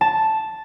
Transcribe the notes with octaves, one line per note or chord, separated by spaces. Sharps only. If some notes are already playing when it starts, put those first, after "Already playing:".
A5